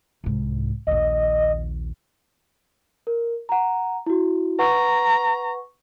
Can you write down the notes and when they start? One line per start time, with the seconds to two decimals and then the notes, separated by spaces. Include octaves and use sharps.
0.24 C2 G#2
0.87 A#1 D#2 D#5
3.07 A#4
3.49 F#5 A#5
4.06 E4 F#4
4.59 B4 F#5 A#5 C#6